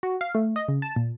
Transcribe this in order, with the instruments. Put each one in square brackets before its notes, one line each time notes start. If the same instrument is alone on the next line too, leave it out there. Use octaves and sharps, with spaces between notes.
[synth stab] F#4
F5
A3
D#5
C#3
A5
A#2